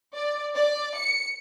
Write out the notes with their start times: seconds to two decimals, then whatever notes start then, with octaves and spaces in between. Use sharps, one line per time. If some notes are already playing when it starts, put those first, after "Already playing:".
0.15 D5
0.55 D5
0.97 C#7